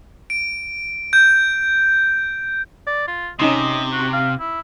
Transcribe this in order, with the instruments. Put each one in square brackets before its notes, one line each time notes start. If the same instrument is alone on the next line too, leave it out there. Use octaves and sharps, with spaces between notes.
[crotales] D7
G6
[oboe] D5
F4
[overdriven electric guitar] C3 [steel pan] C#4 D#4 C6 [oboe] D#5
[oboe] F#4
F5
E4